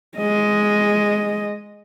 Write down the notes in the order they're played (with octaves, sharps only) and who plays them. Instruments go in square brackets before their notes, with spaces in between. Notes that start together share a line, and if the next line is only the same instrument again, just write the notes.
[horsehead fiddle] G#3 D#5